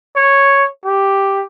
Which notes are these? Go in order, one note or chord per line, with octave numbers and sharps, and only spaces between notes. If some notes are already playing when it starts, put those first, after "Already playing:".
C#5
G4